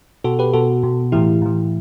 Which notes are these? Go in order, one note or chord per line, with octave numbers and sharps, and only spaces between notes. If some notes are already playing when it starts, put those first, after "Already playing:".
B2 F#4 A4
G4 B4
B2 F#4 A4
B2
A2 E3 E4 G4
A2 E3